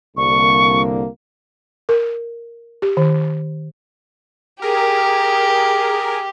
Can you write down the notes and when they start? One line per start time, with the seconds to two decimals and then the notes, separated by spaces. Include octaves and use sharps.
0.17 C2 D3 A#3 C#6
1.89 A#4
2.82 G4
2.97 D#3
4.62 G4 G#4 A#4